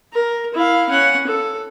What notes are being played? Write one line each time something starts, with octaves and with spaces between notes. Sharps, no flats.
A#4
E4 F5
C#4 F#5
A4